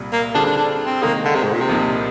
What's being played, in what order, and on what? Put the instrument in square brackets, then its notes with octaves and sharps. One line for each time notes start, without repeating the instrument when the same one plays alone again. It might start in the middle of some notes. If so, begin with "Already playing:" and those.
Already playing: [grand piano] C2 A#2 G3
[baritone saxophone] A#3
[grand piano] D3 G3 C4 F4 G#4 [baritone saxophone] D4
[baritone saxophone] D4
D4
C4
[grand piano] C3 D#3 G#3 D#4 G#4 [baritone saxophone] A#3
[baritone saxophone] D3
C3
G#2
A#2
C3
[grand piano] C2 A#2 F3 A#3 D#4